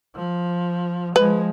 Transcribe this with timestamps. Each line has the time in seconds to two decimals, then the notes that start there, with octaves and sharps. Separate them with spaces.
0.15 F3
1.16 F3 G#3 B4